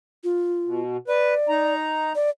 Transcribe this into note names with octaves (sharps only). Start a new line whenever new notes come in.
F4
B2
B4 D5
D#4 A#5
D5